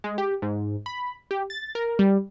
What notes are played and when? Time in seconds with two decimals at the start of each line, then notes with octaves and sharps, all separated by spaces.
0.04 G#3
0.18 G4
0.42 G#2
0.86 B5
1.31 G4
1.50 A6
1.75 A#4
1.99 G3